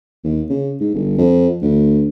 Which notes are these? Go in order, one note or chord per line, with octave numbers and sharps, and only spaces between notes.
D#2
C#3
G#2
G1
F2
D2